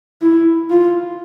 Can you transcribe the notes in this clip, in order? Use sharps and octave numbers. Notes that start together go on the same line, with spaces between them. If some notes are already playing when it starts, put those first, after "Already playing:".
E4
F4